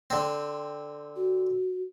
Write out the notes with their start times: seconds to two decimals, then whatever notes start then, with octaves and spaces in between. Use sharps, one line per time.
0.10 D3 C4
1.16 F#4